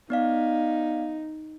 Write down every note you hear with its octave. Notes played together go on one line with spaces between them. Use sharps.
B3 D#4 D5 F5